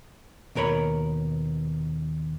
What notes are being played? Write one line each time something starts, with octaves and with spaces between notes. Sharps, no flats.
D#2 B2 A#4 C#5 B5